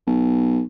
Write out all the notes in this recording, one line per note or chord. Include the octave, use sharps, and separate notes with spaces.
B1